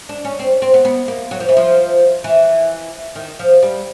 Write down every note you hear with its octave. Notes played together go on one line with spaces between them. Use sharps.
D4
C#4
C4
C4
B3
B3
A#3
F#3
F3
E3
F3
E3
D#3
F3
G3